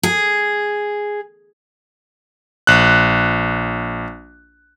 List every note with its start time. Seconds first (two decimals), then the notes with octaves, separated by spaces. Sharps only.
0.03 G#4
2.67 A#1 F#6